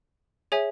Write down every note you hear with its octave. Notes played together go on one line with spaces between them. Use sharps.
G#4 C#5 E5 G#5